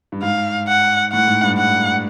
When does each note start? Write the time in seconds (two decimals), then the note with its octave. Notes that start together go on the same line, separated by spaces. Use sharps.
0.12 G2
0.23 G#2 F5
0.68 F#5
1.13 A2 F#5
1.28 G#2
1.43 G2
1.58 F#5